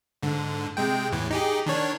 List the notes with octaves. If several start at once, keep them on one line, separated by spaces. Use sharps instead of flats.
G#2 D3
C3 G#3 G5
E2 A2 E3
D#4 G4 G#4
D#3 D4 C#5